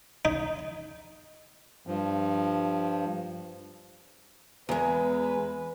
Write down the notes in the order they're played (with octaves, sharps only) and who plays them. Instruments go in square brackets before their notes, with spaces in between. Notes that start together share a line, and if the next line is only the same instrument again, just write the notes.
[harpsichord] D#4
[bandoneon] G2 F3
[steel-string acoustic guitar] E2 G#3 [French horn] B4